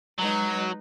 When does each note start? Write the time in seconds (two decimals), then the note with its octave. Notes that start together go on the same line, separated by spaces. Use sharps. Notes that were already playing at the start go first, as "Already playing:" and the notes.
0.18 F#3 G#3 D#4 B4